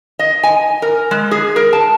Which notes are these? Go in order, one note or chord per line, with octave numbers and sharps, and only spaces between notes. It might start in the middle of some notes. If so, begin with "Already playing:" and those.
D#5
G#5
A#4
G#3
G#4
A#4
A5